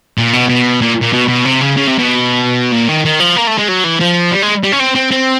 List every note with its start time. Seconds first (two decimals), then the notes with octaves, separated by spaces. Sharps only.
0.18 A#2
0.33 B2
0.49 B2
0.82 A#2
1.02 A#2
1.14 B2
1.29 B2
1.45 C3
1.62 C#3
1.77 C#3
1.88 C3
1.99 B2
2.73 A#2
2.89 D#3
3.05 D#3
3.20 F3
3.37 A#3
3.47 A3
3.58 G#3
3.68 F#3
3.84 E3
4.00 F3
4.32 G3
4.42 G#3
4.64 G3
4.73 C#4
4.80 C4
4.96 C4
5.12 C4